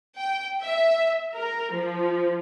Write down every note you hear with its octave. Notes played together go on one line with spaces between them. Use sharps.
G5
E5
A#4
F3